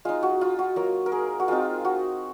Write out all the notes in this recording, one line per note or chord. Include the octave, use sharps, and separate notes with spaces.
G#3 D#4 F4
F#4
F4
F#4
F#3 A#3 F4 A#4
A#4
G#4
F#4
G#3 C4 D#4 F4
F#4